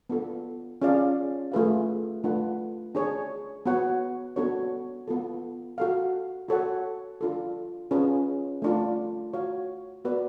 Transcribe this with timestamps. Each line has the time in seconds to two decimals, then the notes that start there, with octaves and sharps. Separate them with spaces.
0.10 B3 D4 F4 A4
0.82 C#4 F4 G#4 D5 F5
1.52 A3 F4 G#4 B4 F5
2.24 A3 D4 F4 B4 F#5
2.95 D4 G#4 C#5
3.66 B3 F#4 C#5 F#5
4.36 B3 D4 F#4 A4 C#5
5.07 B3 F4 A4
5.78 F#4 A4 F5
6.48 F#4 A4 C#5 F#5
7.21 D4 F4 A4
7.91 C#4 F4 G#4 B4
8.62 A3 D4 F4
9.33 F#4 C#5 F5
10.05 B3 F#4 B4 D5